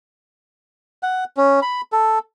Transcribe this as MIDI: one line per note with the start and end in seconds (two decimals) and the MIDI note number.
1.03 1.24 78
1.37 1.60 61
1.62 1.81 83
1.92 2.19 69